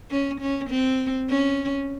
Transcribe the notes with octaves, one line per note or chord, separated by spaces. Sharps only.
C#4
C#4
C4
C#4